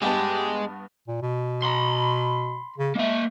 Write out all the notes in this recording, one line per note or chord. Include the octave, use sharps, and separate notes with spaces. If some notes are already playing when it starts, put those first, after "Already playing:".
G2 G#3 B3 G4 G#4 A5
A#2
B2
B5 C6
C#3
G#3 A#3 E5